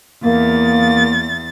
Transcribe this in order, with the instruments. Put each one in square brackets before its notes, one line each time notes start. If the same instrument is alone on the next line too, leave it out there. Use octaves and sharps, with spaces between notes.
[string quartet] E2 A6 [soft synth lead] A#3